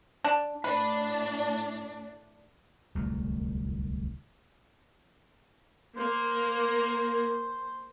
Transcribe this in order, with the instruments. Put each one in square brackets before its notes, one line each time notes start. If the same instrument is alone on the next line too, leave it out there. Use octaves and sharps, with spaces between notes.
[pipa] D4
[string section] A2 D4 [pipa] B4
[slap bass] D1 C2 F2 A3
[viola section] A#3 [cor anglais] C5